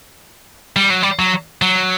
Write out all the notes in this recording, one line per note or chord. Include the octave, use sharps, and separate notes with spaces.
G3
F#3
G3
F#3
F#3